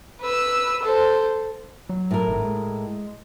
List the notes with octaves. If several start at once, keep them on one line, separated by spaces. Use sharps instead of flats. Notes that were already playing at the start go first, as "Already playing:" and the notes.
B4 E6
A4 C5
F#3
A2 A#4
G#1 G#2
G#3